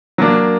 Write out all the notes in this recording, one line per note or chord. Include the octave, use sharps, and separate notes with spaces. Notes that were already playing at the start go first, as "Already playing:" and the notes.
F#3 A#3 D4